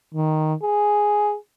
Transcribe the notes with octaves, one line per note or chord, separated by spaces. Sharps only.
D#3
G#4